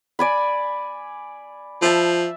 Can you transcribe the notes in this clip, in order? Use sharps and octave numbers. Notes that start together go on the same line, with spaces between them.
D5 G#5 B5
F3 E5 A5